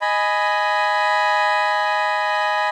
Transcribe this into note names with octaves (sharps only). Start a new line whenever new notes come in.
D#5 G#5 B5